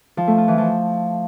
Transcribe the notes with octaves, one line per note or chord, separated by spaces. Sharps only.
F3
A3
F4
E3
F3